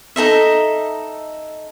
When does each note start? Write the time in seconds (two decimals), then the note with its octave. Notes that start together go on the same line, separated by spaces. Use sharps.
0.16 D#4 A4 D#5 E5